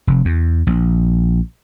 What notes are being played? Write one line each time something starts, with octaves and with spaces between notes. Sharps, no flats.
F1
E2
A#1